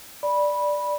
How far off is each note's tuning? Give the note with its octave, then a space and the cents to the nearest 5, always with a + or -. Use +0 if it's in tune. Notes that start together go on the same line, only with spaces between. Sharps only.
D5 +0 B5 -15